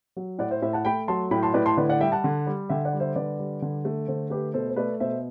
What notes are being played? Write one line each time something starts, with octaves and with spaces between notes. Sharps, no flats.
F#3
A2 D5 F#5
C5 E5
A2 C5 E5
F#5 A5
A3 G5 B5
F#3 A5 C6
A2 G5 B5
A5 C6
A2 B4 D5
A5 C6
D3 B4 D5
D5 F#5
G3 E5 G5
F#5 A5
D3
G3
D3 E5 G5
D5 F#5
G3
C5 E5
D3 B4 D5
G3
D3
A3
D3 A4 C5
A3 G4 B4
B2 A4 C5
C5
A3 B4 D5
B2 C5 E5